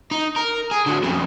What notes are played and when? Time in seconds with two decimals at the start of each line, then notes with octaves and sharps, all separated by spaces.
0.11 D#4
0.36 A#4
0.71 G#4
0.86 D3 F#3
1.04 F2 C#3